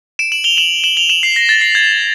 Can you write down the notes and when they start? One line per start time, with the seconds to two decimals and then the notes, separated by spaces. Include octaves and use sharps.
0.19 D7 E7
0.32 E7 F#7
0.44 F7 G7
0.57 E7 F#7
0.84 E7 F#7
0.97 F7 G7
1.09 E7 F#7
1.23 C7
1.36 A#6
1.49 A6
1.61 C7
1.75 G#6